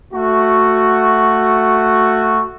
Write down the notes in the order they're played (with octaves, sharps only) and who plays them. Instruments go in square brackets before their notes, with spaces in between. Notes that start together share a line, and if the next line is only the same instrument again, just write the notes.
[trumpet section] A3 F#4